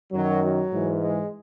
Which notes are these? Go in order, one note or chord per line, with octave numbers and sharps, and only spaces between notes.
F#2 D#3 F#3
F#3
G#2 E3
G#3